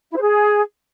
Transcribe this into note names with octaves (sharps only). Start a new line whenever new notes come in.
E4
C5
G#4